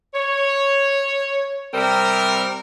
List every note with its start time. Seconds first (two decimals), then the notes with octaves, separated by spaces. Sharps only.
0.14 C#5
1.74 C3 G3 C4 A#4